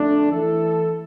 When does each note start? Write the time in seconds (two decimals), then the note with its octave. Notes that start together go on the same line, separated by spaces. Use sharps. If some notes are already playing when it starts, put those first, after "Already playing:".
Already playing: F2 D3 A3 D4
0.31 E3 A3 E4 A4